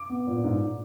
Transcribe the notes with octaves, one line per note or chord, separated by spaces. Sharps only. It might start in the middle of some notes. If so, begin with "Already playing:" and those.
Already playing: D6
B3
A#2
G#2